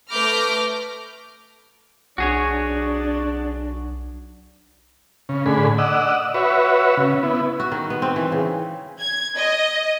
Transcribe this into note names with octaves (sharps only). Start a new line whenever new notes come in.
A3 B4 D6 F6 G6 A#6
B1 D4 F#4 G#4 C#5
C#3
A2 D3 G#4 B5
D5 D#5 F#5 E6
F#4 B4 C#5 E5
C#3
B3 E4
F#4
D#3
B3
C4
E3
C#3
G#6
D#5